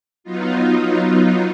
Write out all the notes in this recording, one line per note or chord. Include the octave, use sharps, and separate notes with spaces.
F#3 B3 D#4 F4